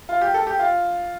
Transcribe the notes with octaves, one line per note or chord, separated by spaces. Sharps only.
F4
G4
A4
G4
F4